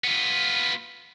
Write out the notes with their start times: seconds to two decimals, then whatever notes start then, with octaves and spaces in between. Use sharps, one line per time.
0.04 B3 F4